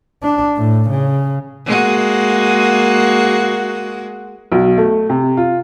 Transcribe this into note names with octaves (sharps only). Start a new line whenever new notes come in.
D4
A2
C#3
G#3 A#3 F#4
B1
A3
C3
F4